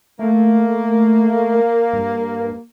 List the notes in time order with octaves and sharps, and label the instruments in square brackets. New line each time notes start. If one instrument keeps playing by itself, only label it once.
[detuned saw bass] A3 [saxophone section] A#3
[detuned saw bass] G2